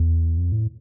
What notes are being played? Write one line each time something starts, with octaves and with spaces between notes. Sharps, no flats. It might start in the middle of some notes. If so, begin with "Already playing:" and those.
Already playing: E2
F2
A2